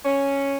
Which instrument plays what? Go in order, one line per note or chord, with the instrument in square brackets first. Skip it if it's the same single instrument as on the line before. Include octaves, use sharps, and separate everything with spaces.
[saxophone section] C#4